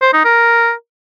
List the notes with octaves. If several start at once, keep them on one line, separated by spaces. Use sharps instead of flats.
C5
D#4
A#4